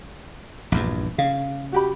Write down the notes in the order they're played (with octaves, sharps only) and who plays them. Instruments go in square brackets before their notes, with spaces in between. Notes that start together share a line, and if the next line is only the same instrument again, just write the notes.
[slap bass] A#1 E2 G2
[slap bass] C#3 [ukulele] F5
[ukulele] F#4 G4 B5